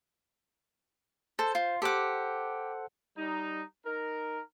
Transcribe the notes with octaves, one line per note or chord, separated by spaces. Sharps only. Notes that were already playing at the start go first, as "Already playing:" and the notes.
A4 C5
F4
G4 A4 C5 F#5 D6
G3 D#4
D#4 A#4